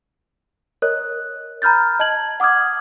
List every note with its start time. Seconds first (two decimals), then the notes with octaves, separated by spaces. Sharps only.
0.82 A#4 C#5 D#5 F#6
1.62 A#5 B5 F6 G6 A6
1.99 D#5 A5 G#6 F#7
2.40 F#5 D6 D#6 F6 G#6